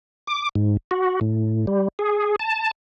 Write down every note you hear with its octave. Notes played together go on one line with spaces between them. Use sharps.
D6
G#2
F#4
A2
G3
G#4
A5